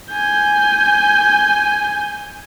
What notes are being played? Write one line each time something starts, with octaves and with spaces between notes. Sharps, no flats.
G#5 G6